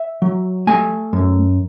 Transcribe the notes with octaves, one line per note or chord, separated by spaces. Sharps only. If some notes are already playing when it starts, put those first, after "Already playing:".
Already playing: E5
F#3
A3 G#5
F#2